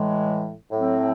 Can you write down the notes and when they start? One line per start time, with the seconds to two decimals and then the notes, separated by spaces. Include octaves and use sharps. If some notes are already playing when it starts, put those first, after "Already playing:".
Already playing: A2 E3 G#3
0.72 A2 F#3 C4